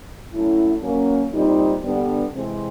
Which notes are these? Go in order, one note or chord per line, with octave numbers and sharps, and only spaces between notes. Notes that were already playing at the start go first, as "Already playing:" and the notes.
F#3 A3 C#4 E4
F#3 A#3 C#4
A#2 G3 C4 D#4
G2 D3 G3 B3
C3 E3 G#3 C4